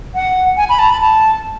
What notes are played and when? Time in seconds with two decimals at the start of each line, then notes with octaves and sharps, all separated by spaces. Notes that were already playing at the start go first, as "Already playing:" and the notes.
0.15 F#5
0.57 G#5
0.69 B5
0.79 A5
0.90 B5
1.01 A5